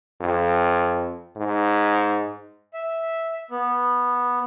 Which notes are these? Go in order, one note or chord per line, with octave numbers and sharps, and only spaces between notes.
F2
G#2
E5
B3